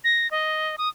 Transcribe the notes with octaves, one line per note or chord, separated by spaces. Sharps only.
A#6
D#5
D#6